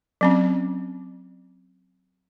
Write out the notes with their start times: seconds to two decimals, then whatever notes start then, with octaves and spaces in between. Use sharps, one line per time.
0.21 F#3 C4 C#4